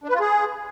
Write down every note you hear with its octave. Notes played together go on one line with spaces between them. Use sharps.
D4
B4
F4
G#4